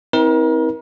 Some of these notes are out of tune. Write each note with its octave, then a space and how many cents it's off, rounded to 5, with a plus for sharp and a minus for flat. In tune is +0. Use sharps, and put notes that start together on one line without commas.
C4 +0 E4 -45 A#4 +35